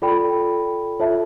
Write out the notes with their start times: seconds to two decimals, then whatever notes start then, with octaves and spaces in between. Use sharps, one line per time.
0.02 F4 A4 D5 G5 B5
1.00 F4 A4 C#5 E5 A5